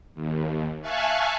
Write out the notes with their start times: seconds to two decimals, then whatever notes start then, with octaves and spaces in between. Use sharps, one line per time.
0.15 D#2
0.82 E5 F5 G#5 A5 C#6 F#6